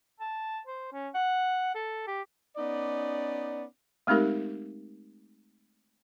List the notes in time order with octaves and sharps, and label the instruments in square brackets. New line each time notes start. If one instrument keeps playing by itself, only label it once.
[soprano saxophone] A5
C5
C#4
F#5
A4
G4
[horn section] B3 C#4 D#4 D5
[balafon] G#3 A3 C4 D#4 G4 A#4